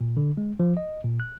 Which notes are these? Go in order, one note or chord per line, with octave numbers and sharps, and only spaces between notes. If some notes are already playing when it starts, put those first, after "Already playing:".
A#2
D3
G#3
F3
D#5
A#2
F#6